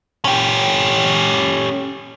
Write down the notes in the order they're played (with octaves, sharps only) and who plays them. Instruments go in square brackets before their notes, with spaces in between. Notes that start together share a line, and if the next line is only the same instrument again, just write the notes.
[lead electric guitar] C#4 G4